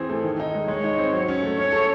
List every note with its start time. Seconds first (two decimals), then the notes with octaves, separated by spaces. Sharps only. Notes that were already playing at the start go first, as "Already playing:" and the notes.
Already playing: E3 C4 G#4
0.10 A3
0.24 D#3
0.40 D#4
0.55 G#3
0.68 G#3 C#5
0.84 D#4
0.98 C4
1.13 F#3
1.28 C#4
1.43 A3
1.58 C#4 C#5
1.73 A4